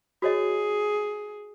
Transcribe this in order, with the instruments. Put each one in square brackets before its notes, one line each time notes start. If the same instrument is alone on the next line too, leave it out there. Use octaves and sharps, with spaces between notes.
[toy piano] F#4 C#5 D#5 [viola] G#4